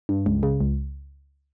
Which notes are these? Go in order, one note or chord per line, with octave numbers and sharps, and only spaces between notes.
G2
C#2
C#3
C#2